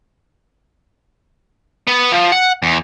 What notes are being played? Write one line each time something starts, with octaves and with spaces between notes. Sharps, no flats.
B3
F3
F#5
E2